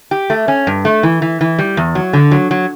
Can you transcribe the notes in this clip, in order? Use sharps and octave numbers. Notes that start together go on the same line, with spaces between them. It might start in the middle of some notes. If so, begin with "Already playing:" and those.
G4
A3
C#4
G2
A3
E3
E3
E3
G3
E2
F#3
D3
F#3
F#3